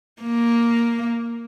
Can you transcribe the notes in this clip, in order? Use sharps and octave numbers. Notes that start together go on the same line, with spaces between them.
A#3